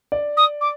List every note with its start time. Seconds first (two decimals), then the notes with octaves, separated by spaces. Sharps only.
0.12 D5
0.37 D#6
0.61 D6